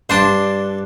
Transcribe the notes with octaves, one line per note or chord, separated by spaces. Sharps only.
G2 D4 C5 A5 C6